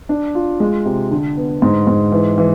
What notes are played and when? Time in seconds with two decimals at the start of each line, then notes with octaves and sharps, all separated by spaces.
0.09 D4
0.35 F4
0.60 G#3
0.86 C3
1.11 D3
1.37 B3
1.62 G#2
1.87 G#2
2.12 E3
2.38 E3